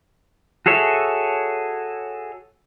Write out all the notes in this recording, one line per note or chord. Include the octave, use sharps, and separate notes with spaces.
F#4 G#4 A4 C#5 E5